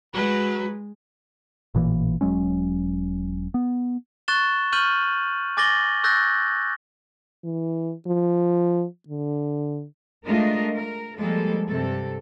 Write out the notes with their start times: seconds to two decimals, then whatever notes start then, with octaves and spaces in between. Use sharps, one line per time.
0.14 F#3 G#3 B4
1.75 A1 A#2 E3 A#3
2.21 E1 F#3 G#3 C#4
3.54 B3
4.28 C#6 F#6 A6 E7 G7
4.72 C#6 F6 G6 D#7 F#7
5.57 G#5 D6 A6 A#6 F#7 G7
6.04 C#6 E6 F#6 G6 A6 A#6
7.44 E3
8.07 F3
9.08 D3
10.25 G#3 A3 D4 F4 A#4 D#5
10.76 A#4
11.18 F3 G3 G#3 A#3 A4
11.69 G2 C3 A4